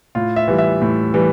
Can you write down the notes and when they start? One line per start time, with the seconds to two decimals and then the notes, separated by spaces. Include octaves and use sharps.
0.15 A2 F4
0.36 E5
0.48 E3 G3
0.58 E5
0.82 A2
1.14 E3 G3